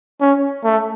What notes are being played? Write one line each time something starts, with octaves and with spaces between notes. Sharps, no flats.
C#4
A3